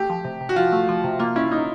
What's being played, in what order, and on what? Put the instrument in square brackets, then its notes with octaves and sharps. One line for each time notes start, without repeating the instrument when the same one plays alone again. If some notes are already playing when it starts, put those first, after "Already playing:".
Already playing: [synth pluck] A3 [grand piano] G4
[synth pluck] F3
C3
C3
[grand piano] F#4
[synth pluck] F3 [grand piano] F4
[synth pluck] A3
F3
C3
[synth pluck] A#3 [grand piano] F4
[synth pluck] C#4 [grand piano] E4
[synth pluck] A#3 [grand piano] D#4